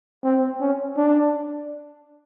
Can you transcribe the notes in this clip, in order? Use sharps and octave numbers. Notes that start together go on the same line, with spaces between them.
C4
C#4
D4